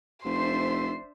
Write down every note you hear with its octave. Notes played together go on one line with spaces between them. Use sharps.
F1 D4 C5 E5 C6